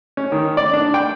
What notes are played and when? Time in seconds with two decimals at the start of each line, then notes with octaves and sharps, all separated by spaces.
0.17 C#4
0.32 D#3
0.57 D5
0.73 D4
0.94 G5